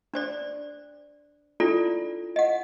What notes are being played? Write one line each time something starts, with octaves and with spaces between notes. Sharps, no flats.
D4 C5 D5
D4 E4 F4 A4 D5
D#5 F#5